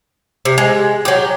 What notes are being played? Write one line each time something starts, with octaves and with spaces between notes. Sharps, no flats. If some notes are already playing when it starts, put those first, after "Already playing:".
C3
G#3
F#3 G4